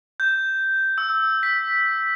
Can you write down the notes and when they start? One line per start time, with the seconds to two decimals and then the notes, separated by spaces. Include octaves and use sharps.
0.20 G6
0.98 E6
1.43 B6